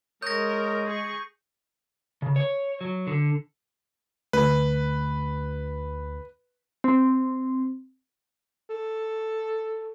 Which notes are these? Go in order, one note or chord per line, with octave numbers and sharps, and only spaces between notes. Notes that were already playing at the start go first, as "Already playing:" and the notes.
G#3 A#4 C#5 D#6 G6 A#6
G#4 C#6
C#3
C#5
F#3
D3
D2 B4
C4
A4